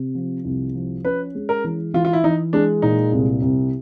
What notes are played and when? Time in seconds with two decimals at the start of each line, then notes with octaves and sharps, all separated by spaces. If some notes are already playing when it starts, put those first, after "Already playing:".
Already playing: C3
0.15 F3
0.45 C2
0.74 F3
1.05 C#4 B4
1.35 G#3
1.49 A#4
1.64 E3
1.94 E3 F4
2.05 F4
2.13 E4
2.24 E3 D#4
2.53 G#3 D4
2.82 A#2 D#4
3.12 C2
3.42 C2